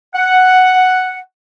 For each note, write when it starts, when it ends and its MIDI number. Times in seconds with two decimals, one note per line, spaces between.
0.15 1.19 78